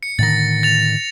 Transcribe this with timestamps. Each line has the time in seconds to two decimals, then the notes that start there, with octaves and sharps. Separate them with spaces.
0.03 C#7
0.19 A2 D3 D#3 A6 A#6
0.63 A6 F7